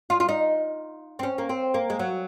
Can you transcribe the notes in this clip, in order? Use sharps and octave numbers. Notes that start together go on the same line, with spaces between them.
F4
F4
D#4
C4
C#4
A#3
C4
A#3
G#3
F#3